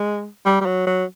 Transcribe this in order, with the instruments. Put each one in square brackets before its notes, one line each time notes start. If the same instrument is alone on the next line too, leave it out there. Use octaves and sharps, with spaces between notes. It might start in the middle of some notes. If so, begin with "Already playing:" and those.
Already playing: [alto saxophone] G#3
G3
G3
F#3
F#3